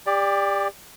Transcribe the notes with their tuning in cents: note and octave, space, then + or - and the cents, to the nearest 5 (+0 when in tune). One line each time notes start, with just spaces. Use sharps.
G4 +30 D5 +0